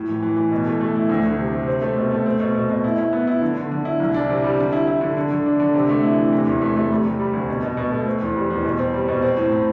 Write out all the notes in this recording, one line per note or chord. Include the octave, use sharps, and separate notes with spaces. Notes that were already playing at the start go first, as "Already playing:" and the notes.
Already playing: A2
E3
E3
E3
B2
A3
A3
E4
D2
D2
C3
C3
C4
A3
B2
A3
C4
B2
B2
B2
E4
E4
B3
E4
D3
D3
D3
E4
C2
D4
C3
G3
D3
E4
E4
D3
D3
D3
D4
D3
C3
A3
E4
E3
C3
E2
A3
A3
G3
C3
G3
D2
B2
B2
B2
A3
C4
E2
G3
E2
B2
C4
G3
B2
C4
A2
A2